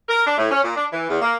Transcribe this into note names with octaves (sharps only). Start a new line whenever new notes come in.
A#4
D4
A2
C#4
A#2
D4
E3
E2
A#3